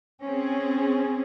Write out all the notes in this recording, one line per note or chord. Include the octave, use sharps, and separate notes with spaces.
C4 C#4 G#4